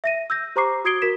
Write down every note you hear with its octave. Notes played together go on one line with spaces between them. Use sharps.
E5 A#6 D#7
E6 G6 A#6
G4 C5 A#5 C#6 D6 C7
F#4 D#6 G#6 C7 D7 G7
F#4 A#4 B6 E7